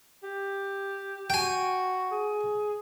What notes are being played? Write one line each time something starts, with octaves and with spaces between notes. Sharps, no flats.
G4
F#4 G5 G#5
G#4